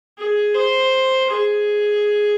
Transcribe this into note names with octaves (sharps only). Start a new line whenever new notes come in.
G#4
C5
G#4